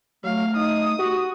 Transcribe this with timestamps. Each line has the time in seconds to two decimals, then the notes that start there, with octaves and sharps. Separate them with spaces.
0.24 F#3 A3 F5
0.56 D#4 D#6
0.99 F#4 G4